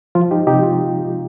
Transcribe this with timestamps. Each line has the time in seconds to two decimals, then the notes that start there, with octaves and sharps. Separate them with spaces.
0.15 F3 F4
0.31 D#4 G4
0.47 C3 D#4 G4
0.63 F4